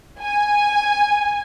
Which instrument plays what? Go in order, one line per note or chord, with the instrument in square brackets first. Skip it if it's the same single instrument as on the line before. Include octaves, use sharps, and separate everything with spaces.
[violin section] G#5